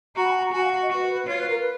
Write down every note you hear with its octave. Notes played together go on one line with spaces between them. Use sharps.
F#4 A#5
B5
G#5
A#5
A#5
F#4 G#5
F5
D#5
F#4 B4
B4
F4 C#5
B4
A#4
B4